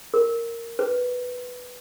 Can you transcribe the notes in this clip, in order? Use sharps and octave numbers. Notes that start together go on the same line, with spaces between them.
A#4
B4